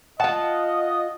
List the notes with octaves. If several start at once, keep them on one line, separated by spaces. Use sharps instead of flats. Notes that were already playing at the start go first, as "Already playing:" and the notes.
F4 D#5 F#5 A5